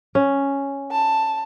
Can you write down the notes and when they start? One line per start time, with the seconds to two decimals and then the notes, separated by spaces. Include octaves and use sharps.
0.15 C#4
0.91 A5